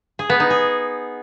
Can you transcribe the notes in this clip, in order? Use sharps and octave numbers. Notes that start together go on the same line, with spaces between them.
G#4
B3
D#4
G#4